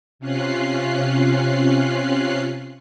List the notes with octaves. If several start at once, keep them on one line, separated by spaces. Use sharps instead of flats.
C3 C#4 F4 F#6 C7